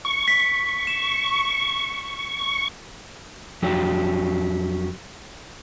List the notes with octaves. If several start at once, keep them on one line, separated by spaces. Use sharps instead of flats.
C#6
B6
E7
F2 F#3 D4 G4